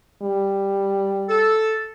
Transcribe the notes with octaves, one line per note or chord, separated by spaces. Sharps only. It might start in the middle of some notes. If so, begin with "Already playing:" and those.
G3
A4